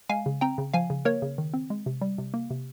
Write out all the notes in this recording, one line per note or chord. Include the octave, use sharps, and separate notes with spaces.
G#3 F5 G#5
C#3
C4 G5 A#5
C#3
F3 F5 G#5
C#3
A#3 A#4 C#5
C#3
D#3
C4
G#3
C3
G3
C3
A#3
C3